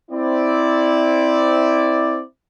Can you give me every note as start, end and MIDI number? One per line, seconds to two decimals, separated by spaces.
0.12 2.21 60
0.12 2.21 64
0.12 2.21 74